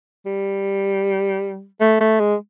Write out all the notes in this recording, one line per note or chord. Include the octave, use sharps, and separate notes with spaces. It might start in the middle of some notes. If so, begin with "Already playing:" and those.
G3
A3
A3
G#3